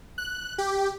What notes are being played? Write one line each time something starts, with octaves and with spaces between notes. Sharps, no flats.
F#6
G4